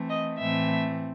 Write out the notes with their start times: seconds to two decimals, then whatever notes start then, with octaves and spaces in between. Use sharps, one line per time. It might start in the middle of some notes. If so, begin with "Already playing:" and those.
Already playing: E3 A3 C4
0.10 D#5
0.40 A2 E3 A3 C4 E5